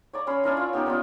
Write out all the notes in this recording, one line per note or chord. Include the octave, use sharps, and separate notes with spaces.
C#5 D5 A#5
C#4 B5 C6
C#4 D4 E4 A#4
F4 C#5 E6
B3 D#4 G4 A#4
B3 D4 D#4 F4